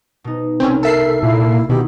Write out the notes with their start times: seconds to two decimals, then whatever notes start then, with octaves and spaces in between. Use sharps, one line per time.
0.24 B2 D#4
0.60 C2 G#3 C4 C#4 F6
0.83 A4 A#4 E5 C7
1.23 A#2 E4
1.69 B2 D#3 D#4 E4 G4